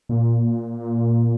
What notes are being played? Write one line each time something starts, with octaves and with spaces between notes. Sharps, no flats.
A#2